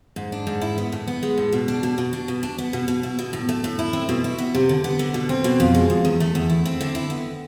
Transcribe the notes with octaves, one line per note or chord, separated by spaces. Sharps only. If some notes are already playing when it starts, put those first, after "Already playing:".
G#2
D4
G#2
E4
B3
A2
B3
G#3
A2
B2
D4
B2
B2
D4
B2
D4
B3
B2
B2
E4
B2
A2
A3
A2
E4
C4
B2
E4
B3
C3
D3
B3
D3
B2
C4
B2
F2
G#3
F2
E2
A3
E2
E4
C4
D3
E4
B3